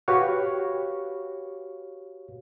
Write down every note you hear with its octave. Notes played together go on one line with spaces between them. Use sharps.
F#4 G4 B4 C#5 F5 C#6